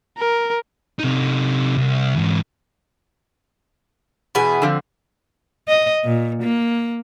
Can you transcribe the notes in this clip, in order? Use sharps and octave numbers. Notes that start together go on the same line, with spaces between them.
A#4
C3 D#4
C2
G#2 E3
E2 B2 B3 E4 G#4
D3 F3 C4
D#5
A#2
A#3